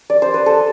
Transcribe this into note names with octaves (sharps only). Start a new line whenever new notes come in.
D5
C5
B4
A4